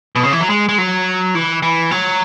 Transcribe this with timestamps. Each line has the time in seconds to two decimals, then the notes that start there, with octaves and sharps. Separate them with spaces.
0.15 B2
0.23 C#3
0.33 E3
0.41 F#3
0.50 G#3
0.69 G#3
0.78 F#3
1.35 E3
1.62 E3
1.91 F#3